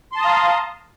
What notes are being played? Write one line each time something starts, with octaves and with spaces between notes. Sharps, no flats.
F5 A5 A#5 C6 D#6